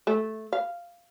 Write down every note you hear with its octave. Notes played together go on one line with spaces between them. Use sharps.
A3
F5